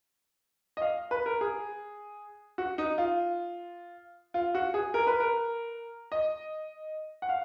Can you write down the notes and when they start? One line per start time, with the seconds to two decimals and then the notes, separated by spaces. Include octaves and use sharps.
0.77 D#5
0.82 F5
1.11 B4
1.26 A#4
1.41 G#4
2.58 F#4
2.78 D#4
2.98 F4
4.34 F4
4.55 F#4
4.74 G#4
4.94 A#4
5.07 B4
5.20 A#4
6.12 D#5
7.22 F#5
7.29 F5